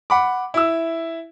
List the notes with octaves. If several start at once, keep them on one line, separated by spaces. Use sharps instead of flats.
F#5 B5 D6
E4 E6